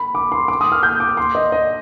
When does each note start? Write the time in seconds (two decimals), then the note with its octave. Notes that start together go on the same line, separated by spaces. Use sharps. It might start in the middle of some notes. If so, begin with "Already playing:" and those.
Already playing: B5
0.15 D6
0.32 C6
0.48 D6
0.61 D#6
0.72 F6
0.83 G6
1.00 D6
1.17 C6
1.35 D#5
1.52 D#5